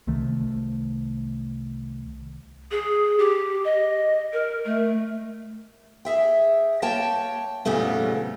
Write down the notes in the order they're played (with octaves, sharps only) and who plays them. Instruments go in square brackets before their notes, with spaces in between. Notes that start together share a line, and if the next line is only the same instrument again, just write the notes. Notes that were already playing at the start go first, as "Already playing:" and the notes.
[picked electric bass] C2 D#3 A3
[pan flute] G#4
G4
D#5
A#4
A3
[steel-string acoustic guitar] G#4 E5 G5
A#3 C#5 G5 A5
F2 A#2 C#3 G3 A3 B3